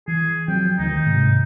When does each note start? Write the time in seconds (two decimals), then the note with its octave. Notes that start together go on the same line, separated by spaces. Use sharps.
0.08 E3 G#4
0.48 F3 F#3 C4 G5
0.79 D2 D#3 D#4
1.06 G#2 C3